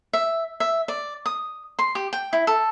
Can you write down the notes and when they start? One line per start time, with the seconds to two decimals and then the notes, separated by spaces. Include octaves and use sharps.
0.13 E5
0.60 E5
0.88 D5
1.26 D#6
1.79 C6
1.95 G4
2.13 G5
2.33 E4
2.47 A4